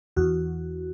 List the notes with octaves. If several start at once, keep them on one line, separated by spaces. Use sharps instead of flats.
E2 F#4